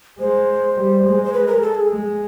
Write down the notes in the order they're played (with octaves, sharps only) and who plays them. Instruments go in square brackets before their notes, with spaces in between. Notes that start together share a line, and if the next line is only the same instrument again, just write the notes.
[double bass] G#3 [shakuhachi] C5
[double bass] G3
G#3
[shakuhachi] C5
B4
A#4
A4
G#4
[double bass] G#3